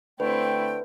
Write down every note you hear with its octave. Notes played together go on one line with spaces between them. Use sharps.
D3 A3 C4 E4 B4 G5